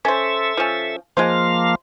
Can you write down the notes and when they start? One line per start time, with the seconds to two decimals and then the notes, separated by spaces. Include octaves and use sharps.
0.05 C#4 A4 C5 E5
0.57 F3 C#4
1.17 F3 G#3 A#3 F4 C5 F5